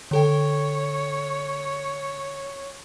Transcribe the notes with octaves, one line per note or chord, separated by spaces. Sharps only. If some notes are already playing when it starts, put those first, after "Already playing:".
D3 A4 C#5 G5